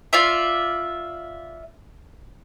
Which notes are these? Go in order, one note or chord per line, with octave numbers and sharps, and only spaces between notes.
F4 D5 E5